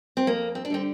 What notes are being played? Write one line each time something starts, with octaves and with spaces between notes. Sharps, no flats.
C4
F2 A#3
C4
D4
D3 G3 C4